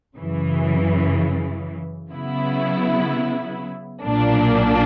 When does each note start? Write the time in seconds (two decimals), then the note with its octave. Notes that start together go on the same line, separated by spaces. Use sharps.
0.17 F#2 C#3 E3
2.10 C#3 F#3 B3 E4
4.04 B1 A#2 A#3 D4